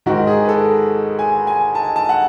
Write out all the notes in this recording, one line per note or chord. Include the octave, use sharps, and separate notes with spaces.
G#2 D#3 F#4
G#4
B4
A4
G#5
G#5
A5
A5
F#5